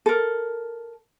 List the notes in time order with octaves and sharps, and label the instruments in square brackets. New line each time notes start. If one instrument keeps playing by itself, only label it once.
[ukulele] A4 A#4